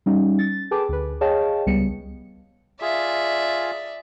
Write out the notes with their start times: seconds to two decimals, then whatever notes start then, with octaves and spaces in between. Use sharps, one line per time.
0.06 G3 C#4 D#4
0.39 A6
0.71 G#4 A4 B4 G5 A5 D6
0.89 D2 B4
1.21 G#4 C#5 D#5 F5 G5 A5
1.66 C#2 G3 B3 C#7
2.82 F4 G#4 D5 E5